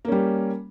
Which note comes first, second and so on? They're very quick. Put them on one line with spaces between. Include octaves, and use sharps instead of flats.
A#3 C#4 G3